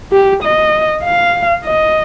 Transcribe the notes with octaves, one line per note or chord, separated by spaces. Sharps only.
G4
D#5
F5
D#5